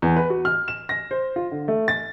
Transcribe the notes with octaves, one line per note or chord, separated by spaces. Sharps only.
E2
B4
F#4
F6
E7
A#6
C5
F4
D3
A3
A6